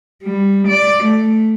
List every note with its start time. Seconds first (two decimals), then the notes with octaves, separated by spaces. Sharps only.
0.23 G3
0.68 D5
1.04 A3